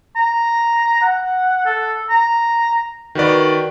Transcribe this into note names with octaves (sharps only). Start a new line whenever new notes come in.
A#5
F#5
A4
A#5
D#3 F#4 B4 D5